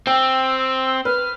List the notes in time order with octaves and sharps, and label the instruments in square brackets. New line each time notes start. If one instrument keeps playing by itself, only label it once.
[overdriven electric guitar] C4 [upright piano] G5 [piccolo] E6
[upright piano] B4 [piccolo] F6